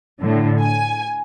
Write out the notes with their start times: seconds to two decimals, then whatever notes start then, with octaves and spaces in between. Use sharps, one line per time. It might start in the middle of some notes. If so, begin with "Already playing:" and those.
0.21 A2 D3
0.61 G#5